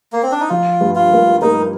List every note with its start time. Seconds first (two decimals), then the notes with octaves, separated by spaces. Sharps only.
0.12 A#3
0.23 C4
0.32 D4
0.40 D#4
0.49 F3 F4
0.81 G2
0.95 F4
1.11 A#3
1.42 A#3 D#4